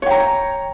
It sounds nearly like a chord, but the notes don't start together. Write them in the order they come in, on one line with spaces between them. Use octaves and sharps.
C#5 G5 A#5